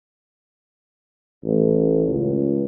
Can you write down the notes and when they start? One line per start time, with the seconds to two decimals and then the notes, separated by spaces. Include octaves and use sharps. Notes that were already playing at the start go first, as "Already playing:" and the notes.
1.44 A1
2.08 C#2